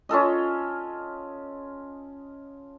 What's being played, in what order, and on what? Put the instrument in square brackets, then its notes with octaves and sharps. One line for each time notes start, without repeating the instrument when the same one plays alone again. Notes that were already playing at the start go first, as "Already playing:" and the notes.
[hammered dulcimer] C#4 F4 A4 D#5